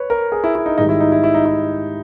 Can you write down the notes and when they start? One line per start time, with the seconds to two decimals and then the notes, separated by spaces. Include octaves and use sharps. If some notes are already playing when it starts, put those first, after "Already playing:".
Already playing: B4 C#5
0.10 A#4
0.32 G#4
0.44 E4
0.55 E4
0.66 D#4
0.78 G#2 D#3 G3 D#4
0.89 E4
1.00 D#4
1.12 E4
1.24 E4
1.35 D#4
1.46 E4